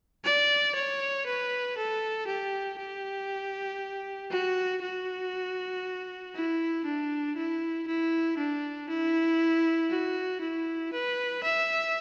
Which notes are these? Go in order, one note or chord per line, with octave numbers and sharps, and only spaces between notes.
D5
C#5
B4
A4
G4
G4
F#4
F#4
E4
D4
E4
E4
D4
E4
F#4
E4
B4
E5